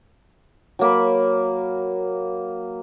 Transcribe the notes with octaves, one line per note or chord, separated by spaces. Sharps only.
F#3 A#3 B5